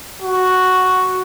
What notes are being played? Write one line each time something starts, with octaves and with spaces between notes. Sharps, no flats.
F#4